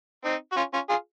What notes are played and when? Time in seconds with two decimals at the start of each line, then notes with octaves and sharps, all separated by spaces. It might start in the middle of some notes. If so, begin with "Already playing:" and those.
0.24 C4 D#4
0.52 F#4
0.57 C#4 F4
0.74 C#4 F4
0.89 F4 G#4